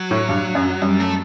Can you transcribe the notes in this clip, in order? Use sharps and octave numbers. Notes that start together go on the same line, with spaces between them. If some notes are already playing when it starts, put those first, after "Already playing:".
Already playing: F#3
A2
G2
F#2
F#2 G3
A3